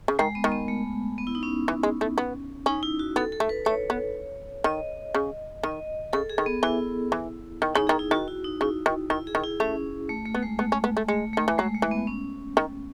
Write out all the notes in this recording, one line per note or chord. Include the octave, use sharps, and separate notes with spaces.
C#3
D#3 G#3
B3
D#3
B3
A3
B3
E4
D#4
C#4
E3
G#3
A3
B3
C#4 D#4
E4
F#4
B3 A4
A4
A3
B4
A3 C#5
B3
D#3 D#5
C#3
D#3 D#5
C#3 A4
G#4
D#3
B3
E3 E4
E3
D#3
C#3 D#4
D#3 G#4
E4
D#3 F#4
E4
D#4
C#3 E4
D#3
D#3 E4
G#4
D#3
E4
A3 C#4
A3
A3
B3
G#3
A3 B3
C#4
B3
A3
G#3 A3
D#3 A3
E3
F#3 G#3
A3
E3
B3
C#4
D#3